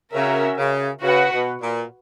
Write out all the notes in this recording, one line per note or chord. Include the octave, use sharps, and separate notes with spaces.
C#3 C#4 F#4 A#4 E5
C#3
C#3 F#4 B4 F#5
B2
A#2